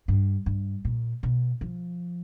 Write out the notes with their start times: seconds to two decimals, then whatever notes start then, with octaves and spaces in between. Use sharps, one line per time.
0.08 G2
0.46 G2
0.85 A#2
1.23 B2
1.61 F3